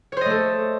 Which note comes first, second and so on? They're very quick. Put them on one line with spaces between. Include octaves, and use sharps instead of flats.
C#5 C5 D#5 A3 A4